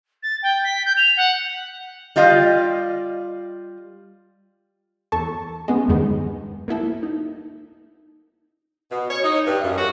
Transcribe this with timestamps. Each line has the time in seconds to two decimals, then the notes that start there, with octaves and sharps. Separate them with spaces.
0.23 A6
0.42 G5
0.64 B6
0.85 G6
0.97 F7
1.17 F#5
2.16 G3 F4 D#5 F5
5.12 E2 A4 A5 C#6
5.68 G#3 B3 C#4
5.88 E2 G2 D#3 G#3 B3
6.68 A#3 B3 E4 A4
7.03 D#4
8.91 B2
9.10 C#5
9.24 D#4
9.46 G2
9.63 F#2
9.77 F#4